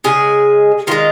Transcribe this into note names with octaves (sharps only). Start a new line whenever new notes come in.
C#3 G#3 G#4
D#3 G#3 F4